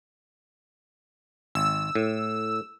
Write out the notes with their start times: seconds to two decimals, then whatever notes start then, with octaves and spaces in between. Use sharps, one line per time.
1.55 G#1 E6
1.95 A2